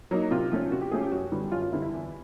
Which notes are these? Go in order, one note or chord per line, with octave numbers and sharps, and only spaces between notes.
F#3 A#3 D#4
C3 F4
F3 A3 C#4
C3 F#4
G4
F3 A3 C#4 G#4
G4
F#2 F#4
D3 G3 B3
F#2 F4
F4
D3 G3 B3 E4
E4
E2